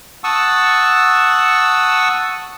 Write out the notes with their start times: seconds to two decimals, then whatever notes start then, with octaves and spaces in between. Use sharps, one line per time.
0.24 F#5 A5 C#6 D#6 E6